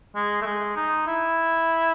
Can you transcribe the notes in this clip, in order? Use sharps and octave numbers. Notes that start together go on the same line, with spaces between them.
G#3
A3
G#3
D#4
E4